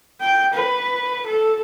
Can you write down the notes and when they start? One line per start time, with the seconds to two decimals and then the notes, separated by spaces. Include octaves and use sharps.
0.21 G5
0.54 B4
1.26 A4